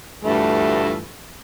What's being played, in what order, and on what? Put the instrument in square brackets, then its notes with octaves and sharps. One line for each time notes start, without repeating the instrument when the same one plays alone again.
[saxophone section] D2 G2 E3 A3 F4